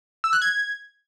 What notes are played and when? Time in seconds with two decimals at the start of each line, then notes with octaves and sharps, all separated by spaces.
0.24 E6
0.33 F#6
0.42 G#6